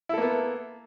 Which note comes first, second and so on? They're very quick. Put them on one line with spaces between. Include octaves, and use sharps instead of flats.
E4 A4 A#3 B3